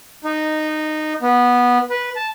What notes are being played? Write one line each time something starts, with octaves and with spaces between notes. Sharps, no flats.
D#4
B3
B4
A5